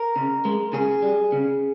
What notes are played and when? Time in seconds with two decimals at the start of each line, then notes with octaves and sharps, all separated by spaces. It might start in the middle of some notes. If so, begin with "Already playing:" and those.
Already playing: A#4
0.16 C#3
0.45 G#3
0.73 C#3 G#4
1.02 G3
1.32 C#3